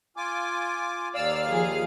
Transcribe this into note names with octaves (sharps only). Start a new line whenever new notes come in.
F4 G#5 D6
D#2 D5 F5 E6 F6
F3 G#4